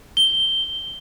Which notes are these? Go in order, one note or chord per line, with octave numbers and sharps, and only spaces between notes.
G7